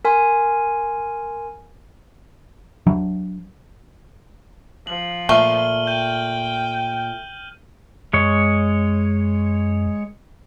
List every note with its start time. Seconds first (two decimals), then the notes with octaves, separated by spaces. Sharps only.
0.05 A#4 G#5 C6
2.87 F#3 D4
4.87 F3 F#7
5.29 A#2 A3 F6 D#7 G7
5.87 G5 G6 D#7
8.13 F#2 G#3 C#5